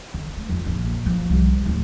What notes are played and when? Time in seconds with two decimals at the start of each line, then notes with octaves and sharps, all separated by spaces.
0.14 D3
0.37 A3
0.49 F2
0.66 A#1
1.06 F3
1.30 C2
1.66 D1